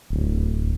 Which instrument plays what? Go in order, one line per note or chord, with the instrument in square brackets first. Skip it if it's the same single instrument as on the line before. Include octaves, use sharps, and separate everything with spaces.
[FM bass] D1